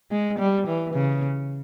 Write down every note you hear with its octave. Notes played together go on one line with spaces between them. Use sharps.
G#3
G3
E3
C#3